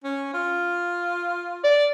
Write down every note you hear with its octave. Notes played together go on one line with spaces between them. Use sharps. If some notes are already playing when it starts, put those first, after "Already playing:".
C#4
F4
D5